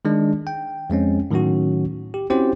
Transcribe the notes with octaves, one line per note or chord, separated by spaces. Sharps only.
D#3 G#3 D4
G5
F2 G#3 C4 C#4
A2 D#3 F#3 C#4 F#4
G4
C4 C#4 E4 F#4 G4 C5